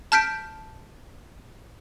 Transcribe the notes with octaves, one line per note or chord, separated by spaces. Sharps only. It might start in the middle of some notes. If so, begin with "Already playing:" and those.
A5 F6 G6 B6 D7